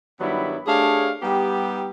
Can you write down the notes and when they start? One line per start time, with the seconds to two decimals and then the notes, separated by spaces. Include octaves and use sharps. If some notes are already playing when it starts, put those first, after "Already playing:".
0.21 G2 D#3 F#3 G3 B3 E4
0.67 A3 D4 G4 G#4 C#5 F5
1.23 G3 B3 D#4 G4